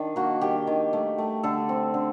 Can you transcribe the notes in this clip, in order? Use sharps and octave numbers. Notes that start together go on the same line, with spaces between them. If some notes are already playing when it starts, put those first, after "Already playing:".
Already playing: D#3 D4
A#3 F#4
D#3 G4
D#3
A3
A3
D3 A4
C4
D3